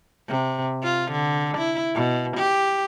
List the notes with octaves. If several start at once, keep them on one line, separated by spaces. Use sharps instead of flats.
C3
F4
D3
E4
B2
G4